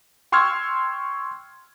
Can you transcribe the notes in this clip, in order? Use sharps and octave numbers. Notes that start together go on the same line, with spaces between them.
G5 C6 C#6 E6 F6 G#6